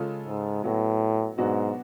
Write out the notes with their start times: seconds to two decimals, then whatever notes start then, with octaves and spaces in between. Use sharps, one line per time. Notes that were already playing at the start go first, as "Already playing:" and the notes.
Already playing: C#3 G#3 C#4 F4 A4
0.26 G#2
0.64 A2 F#3 B3 F#4
1.38 G#2 B2 F#3 B3 D4 F#4